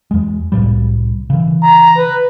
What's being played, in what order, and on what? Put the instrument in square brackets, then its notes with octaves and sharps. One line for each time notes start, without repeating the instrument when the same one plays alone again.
[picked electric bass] E2 G#3
C2 A2 G3
C#3 E3
[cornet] A#5
B4